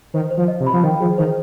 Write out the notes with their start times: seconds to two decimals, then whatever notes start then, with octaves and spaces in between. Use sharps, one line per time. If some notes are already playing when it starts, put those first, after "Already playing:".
0.14 D#3 C5
0.31 C5
0.37 F3
0.48 D#5
0.60 C3
0.67 B5
0.73 F3
0.83 D#3 G5
1.00 F3 G#4
1.18 D#3 C5